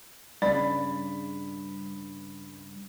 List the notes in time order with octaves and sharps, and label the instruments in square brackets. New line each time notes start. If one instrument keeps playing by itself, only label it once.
[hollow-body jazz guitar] G2 C#3 [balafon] D5 [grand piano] B5